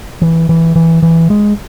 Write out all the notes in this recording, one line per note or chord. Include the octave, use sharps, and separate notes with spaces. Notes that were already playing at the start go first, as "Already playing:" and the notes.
E3
E3
E3
E3
G#3